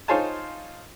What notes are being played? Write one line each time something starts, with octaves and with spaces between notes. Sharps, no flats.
D#4 F4 C5 C#5 G#5 A5